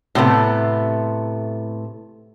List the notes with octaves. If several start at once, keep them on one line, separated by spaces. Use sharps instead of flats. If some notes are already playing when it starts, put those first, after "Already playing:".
A2 C3 A3 B3